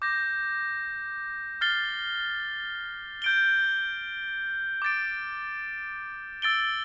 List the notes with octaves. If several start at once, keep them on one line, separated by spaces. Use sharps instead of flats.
D6 G6 A#6
F6 A6 C7 G7
G6 D7 G7
D6 A6 D7
E6 A6 D7 G7